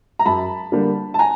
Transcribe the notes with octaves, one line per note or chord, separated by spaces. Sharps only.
A#5
F#2 A5 B5
D3 G3 A#3 D4
A5
G#5 A#5